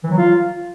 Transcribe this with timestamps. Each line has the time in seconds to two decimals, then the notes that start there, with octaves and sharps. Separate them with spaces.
0.04 E3
0.11 F#3
0.18 F4